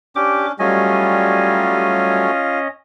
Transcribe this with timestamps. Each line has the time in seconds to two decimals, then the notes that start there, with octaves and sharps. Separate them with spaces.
0.16 C#4 D4 G4 D6
0.59 F#3 G3 A3 C#4 F4 D#5 G#5